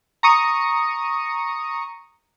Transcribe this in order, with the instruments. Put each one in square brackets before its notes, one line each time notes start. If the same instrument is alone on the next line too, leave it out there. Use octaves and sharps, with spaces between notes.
[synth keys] A#5 C#6 D#6 C#7